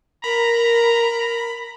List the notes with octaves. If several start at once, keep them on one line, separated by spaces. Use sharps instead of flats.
A#4 A#5 B5